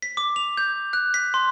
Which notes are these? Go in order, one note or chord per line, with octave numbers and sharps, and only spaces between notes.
B6
D6
F7
G6
F#6
B6
C6